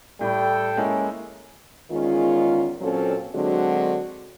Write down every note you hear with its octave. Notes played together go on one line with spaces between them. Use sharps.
A2 G3 A4 G5
G#3 A#3 C#4 E4
E2 D#3 G#3 C#4 F4
A#2 F#3 C4 C#4 F4 A4
D3 F#3 G#3 C4 D4 F#4